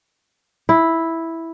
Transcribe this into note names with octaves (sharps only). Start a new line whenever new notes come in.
E4